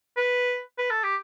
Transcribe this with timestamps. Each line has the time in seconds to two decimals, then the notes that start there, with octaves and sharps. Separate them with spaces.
0.17 B4
0.78 B4
0.90 A4
1.03 G4